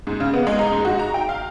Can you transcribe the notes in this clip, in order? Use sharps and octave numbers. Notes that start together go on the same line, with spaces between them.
G#2
C#3
B3
G#3
D#4
G#2
F#4
A#5
G5
F5